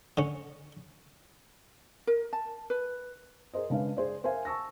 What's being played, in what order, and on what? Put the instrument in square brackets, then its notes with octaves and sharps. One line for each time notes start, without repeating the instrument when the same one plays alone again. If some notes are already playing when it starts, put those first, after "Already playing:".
[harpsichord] D3 C#4
[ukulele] A#4
A5
B4
[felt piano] G#4 A#4 C5 D#5
C#3 G#3 D4 B4 F5
G#4 C5 D5
A#4 C5 E5 F5 G#5
A5 C#6 E6 A#6